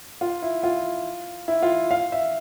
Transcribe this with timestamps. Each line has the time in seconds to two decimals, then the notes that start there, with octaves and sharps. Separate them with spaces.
0.21 F4
0.42 E4
0.63 F4
1.48 E4
1.62 F4
1.91 F5
2.12 E5